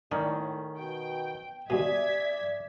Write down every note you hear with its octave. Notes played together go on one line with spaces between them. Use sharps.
A2 D#3 C#4 D4
B2 G5
D#2 B2 G#4 D5 E5 G#6 B6